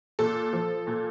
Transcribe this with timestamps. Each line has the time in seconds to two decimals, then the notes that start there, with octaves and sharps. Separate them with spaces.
0.19 A#2 A4
0.53 F3
0.87 A#2